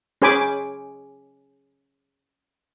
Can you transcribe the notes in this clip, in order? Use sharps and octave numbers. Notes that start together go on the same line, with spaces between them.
C#4 G#4 C5 G#5 B5 D6